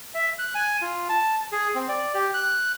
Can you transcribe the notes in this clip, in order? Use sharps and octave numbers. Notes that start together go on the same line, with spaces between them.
E5
F#6
G#5
F4
A5
G#4
C4
D5
G4
F#6